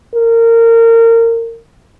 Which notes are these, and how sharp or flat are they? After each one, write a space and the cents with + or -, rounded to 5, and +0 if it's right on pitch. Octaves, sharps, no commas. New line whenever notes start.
A#4 -25